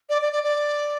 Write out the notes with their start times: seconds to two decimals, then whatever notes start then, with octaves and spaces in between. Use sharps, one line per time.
0.09 D5
0.21 D5
0.32 D5
0.43 D5